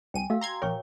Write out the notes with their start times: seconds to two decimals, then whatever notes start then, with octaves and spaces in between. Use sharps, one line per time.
0.14 C2 G5 G#5 D#7
0.30 A3 F#4 F5 E6
0.41 A#5 C6 G#6
0.62 A#1 A#4 C#5 G5 C#6